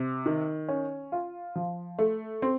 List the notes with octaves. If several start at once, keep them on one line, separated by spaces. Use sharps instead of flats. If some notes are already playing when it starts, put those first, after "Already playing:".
Already playing: C3
D#3
C#4
F4
F3
A3
C4